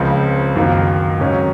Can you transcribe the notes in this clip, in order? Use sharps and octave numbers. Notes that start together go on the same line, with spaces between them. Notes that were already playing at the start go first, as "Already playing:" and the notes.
Already playing: C#2 C#3 F3 C4
F#2 D#3 A#3 F4
G#2 D#3 F#3 C#4